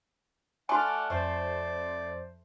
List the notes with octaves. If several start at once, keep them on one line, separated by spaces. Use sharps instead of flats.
A3 F#4 D5 F#5 G#5 D6 F6
F2 A3 C5 D5